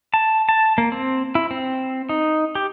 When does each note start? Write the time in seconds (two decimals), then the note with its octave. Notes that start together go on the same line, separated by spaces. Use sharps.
0.14 A5
0.49 A5
0.78 A#3
0.92 C4
1.35 E4
1.51 C4
2.09 D#4
2.55 G4